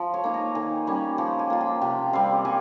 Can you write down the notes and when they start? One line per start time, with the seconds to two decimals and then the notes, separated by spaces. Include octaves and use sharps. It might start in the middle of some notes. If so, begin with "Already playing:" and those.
Already playing: F3
0.14 C#5
0.24 A#3 D#4
0.34 A#5
0.55 D#3 G#5
0.87 G3 A#3 C#4
1.18 F3 G5
1.39 G#5
1.50 A#3 F4
1.61 G5
1.82 C3 G5
2.13 G3 C4 F5
2.45 G3 G#5